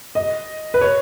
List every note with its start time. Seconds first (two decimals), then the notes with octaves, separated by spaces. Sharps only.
0.15 D#5
0.74 B4
0.81 C#5